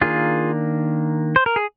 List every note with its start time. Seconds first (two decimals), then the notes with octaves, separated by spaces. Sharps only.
0.01 D#3 A#3 D4 F4 G#4
1.36 C5
1.46 A#4
1.56 G#4